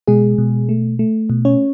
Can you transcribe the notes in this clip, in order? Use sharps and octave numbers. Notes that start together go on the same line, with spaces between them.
B2 G#3 G#4
B2
A3
A3
B2
C#4 C#5